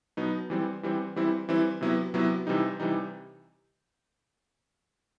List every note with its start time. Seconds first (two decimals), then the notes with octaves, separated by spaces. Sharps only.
0.17 B2 F#3 B3 D#4
0.50 E3 G3 C4
0.83 E3 G3 C4
1.16 E3 G3 C4 E4
1.49 E3 G3 C4 E4
1.81 C3 F#3 B3 E4
2.14 C3 F#3 B3 E4
2.47 C3 E3 G3 D#4
2.80 C3 E3 G3 D#4